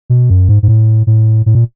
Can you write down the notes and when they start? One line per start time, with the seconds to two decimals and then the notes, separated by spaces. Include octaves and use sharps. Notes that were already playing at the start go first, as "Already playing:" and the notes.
0.10 B2
0.30 F#2
0.49 G#2
0.63 G#2
0.68 A2
1.07 A2
1.46 A2
1.55 A#2